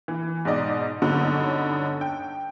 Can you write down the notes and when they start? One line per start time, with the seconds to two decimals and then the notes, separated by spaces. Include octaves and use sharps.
0.08 E3
0.45 G#2 B2 D#4 D5 D#5
1.02 G2 D3 F#3 B3 C#4 D#4
2.01 G5